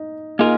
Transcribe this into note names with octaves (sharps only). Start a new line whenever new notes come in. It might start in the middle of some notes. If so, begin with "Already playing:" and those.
Already playing: D#4
A#3 D#4 F4 G#4 A#4